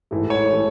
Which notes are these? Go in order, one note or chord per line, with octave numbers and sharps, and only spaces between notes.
A1 G#2 E3 A3
C#5
E3 A3